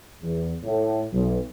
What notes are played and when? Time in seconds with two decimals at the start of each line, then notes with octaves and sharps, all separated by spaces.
0.22 E2
0.64 A2
1.12 B1